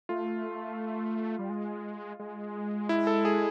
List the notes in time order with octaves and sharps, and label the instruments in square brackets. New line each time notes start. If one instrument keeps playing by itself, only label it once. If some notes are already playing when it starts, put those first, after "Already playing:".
[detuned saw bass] A3 [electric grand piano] F4
[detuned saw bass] G3
G#3
G#3
[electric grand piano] E4
A4
G#4